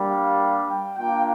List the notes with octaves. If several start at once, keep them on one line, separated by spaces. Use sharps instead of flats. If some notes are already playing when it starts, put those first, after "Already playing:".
Already playing: G3 A#3 D4 G4
F5
G5
A#3 D4 F4 G5